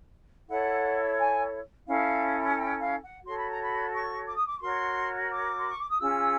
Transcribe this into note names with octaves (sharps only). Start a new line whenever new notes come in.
E4 A4 C#5 F#5
G#5
C#4 E4 A4 F5
G#5
G5
F5
F#5
F#4 A4 C#5 C6
B5
A#5
B5
C#6
D6
D#6
D6
C#6
F#4 A#4 C#5 C6
D6
C6
C#6
D6
D#6
C#4 F4 G#4 E6